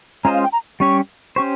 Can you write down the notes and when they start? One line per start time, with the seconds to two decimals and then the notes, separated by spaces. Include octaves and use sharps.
0.24 G#3 C#4 F4 C5 D#5 A#5
0.34 F5
0.43 G5
0.52 A#5
0.80 G3 C#4 G4 C#5 C#6
1.36 C#4 G4 C5 C#6